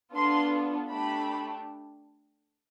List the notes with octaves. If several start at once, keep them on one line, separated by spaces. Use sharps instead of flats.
B3 D4 F4 A4 C6
A3 D4 G4 B5